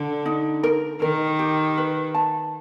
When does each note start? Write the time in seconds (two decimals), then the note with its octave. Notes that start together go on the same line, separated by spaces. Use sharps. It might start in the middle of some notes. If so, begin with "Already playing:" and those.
Already playing: D3
0.26 D#4
0.63 A#4
1.01 D#3 A#4
1.39 G4
1.78 B4
2.15 A5